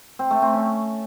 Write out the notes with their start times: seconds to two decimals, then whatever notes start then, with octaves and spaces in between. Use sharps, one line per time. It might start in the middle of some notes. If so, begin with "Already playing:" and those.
0.19 C4
0.31 A3
0.42 C4
0.53 C#4